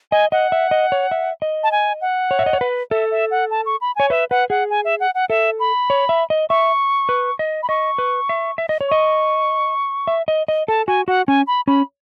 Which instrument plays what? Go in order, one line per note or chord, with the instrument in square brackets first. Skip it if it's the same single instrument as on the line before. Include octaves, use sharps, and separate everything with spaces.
[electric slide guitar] D#5 [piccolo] G#5
[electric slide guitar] D#5 [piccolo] F#5
[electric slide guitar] E5
D#5
C#5
E5
D#5
[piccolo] A5
G#5
F#5
[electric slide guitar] C#5
E5
D#5
C#5
B4
[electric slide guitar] A4 [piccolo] E5
[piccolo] E5
F#5
A5
C#6
B5
[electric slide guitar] C#5 [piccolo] G#5
[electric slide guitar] B4 [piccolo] E5
[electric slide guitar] B4 [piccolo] F#5
[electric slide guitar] G#4 [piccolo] F#5
[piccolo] G#5
E5
F#5
F#5
[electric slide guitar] A4 [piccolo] E5
[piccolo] B5
[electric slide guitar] C#5
E5
D#5
[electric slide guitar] E5 [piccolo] C#6
[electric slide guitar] B4
D#5
[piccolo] B5
[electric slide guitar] D#5 [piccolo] C#6
[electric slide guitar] B4
E5
E5
D#5
C#5
[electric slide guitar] D#5 [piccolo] C#6
[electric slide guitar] E5
D#5
D#5
[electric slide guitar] A4 [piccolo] A5
[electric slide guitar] F#4 [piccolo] G#5
[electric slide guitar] F#4 [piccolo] F#5
[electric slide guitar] C#4 [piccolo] G#5
[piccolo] B5
[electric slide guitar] C#4 [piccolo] B5